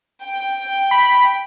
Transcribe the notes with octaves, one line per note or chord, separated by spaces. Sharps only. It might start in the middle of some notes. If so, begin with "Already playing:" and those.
G5
B5